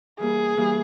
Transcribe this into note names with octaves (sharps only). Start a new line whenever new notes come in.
E3 G3 A#3 G#4
E3 G3 A#3